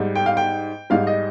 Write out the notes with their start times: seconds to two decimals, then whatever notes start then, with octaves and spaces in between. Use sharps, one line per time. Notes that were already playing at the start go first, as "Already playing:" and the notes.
Already playing: G#2 G3
0.16 G5
0.26 F5
0.37 G5
0.90 G#2 G3 F5
1.07 D#5